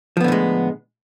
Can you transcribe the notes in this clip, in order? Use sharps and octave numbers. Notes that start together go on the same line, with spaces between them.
A2 D3 F3 G#3 B3